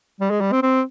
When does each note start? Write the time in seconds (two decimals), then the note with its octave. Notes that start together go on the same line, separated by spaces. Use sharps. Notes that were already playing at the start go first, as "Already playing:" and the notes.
0.20 G3
0.30 G#3
0.41 G3
0.52 C4
0.63 C4